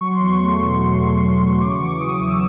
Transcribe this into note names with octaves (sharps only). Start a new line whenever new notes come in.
F#3 C#6
C6
E2 C#6
A3
B2
F#3
E2
F#3
F#3
C#3 D6
C#6
E3 D6
E3 D#6
E2
E6